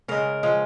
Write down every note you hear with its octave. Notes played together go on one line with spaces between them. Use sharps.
C#3 G#3 A#4
F3 G#3